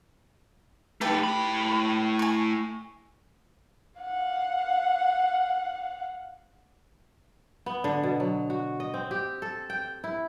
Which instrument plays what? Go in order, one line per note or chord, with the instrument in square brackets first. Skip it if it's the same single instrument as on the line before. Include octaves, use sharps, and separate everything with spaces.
[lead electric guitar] A3 D#4 [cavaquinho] G4 A4 B4
[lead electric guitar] A2 B5
[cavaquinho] G#5 C#6
[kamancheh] F5 F#5
[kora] B3
D3
B2
F#3
F#4
D#5
C4
G4
A4
G5
E4